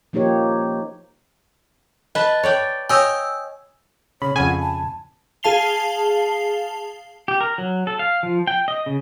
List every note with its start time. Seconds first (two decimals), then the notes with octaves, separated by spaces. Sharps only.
0.13 F3 A#3 D#4 G4 C#5
2.15 B4 D#5 A5
2.43 C#5 D5 G5
2.89 C#5 D#5 G5 G#5 D#6 E6
4.22 C#3 C#5 B5
4.36 F2 C#3 F#5 G#5
4.61 A5
5.43 G#4 F5 A5 C7 F7 G7
7.28 G4
7.41 A#4
7.58 F#3
7.87 A4
7.99 F5
8.23 F3
8.47 G5
8.68 D#5
8.86 C#3